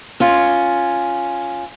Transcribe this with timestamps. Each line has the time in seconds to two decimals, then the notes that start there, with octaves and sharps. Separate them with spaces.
0.20 C#4 F4